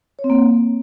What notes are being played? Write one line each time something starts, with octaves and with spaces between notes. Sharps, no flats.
C#5
C4
A#3